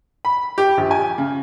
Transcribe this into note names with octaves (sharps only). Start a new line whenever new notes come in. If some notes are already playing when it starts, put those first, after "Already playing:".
B5
G4
A#1
G#5
C#3